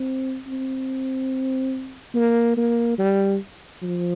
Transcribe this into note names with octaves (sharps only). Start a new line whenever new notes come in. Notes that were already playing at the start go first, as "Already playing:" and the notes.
Already playing: C4
C4
A#3
A#3
G3
F3